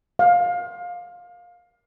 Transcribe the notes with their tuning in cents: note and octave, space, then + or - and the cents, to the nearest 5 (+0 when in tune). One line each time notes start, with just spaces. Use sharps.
F5 +15